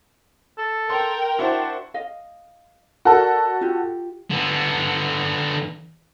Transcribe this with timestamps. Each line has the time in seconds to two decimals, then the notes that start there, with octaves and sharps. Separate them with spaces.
0.58 A4
0.90 A#4 G5 C6
1.39 D4 E4 F#4 C5
1.94 D#5 F5
3.05 F#4 A4 A#4 D5 F#5
3.61 F4 G4
4.31 D3 B3